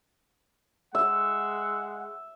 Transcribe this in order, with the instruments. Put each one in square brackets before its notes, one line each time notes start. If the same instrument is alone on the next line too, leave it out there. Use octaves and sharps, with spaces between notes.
[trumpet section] G#3 F#5 [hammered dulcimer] E5